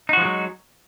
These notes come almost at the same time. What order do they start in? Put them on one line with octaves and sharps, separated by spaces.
D#4 F#4 F3 G#3 F#3